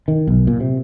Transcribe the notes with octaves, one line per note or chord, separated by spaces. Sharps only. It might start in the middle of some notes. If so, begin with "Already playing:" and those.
D#3
B1
A#2
C3